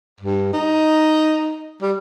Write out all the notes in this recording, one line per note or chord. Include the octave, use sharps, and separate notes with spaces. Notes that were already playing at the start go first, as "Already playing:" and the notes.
G2
D#4
G3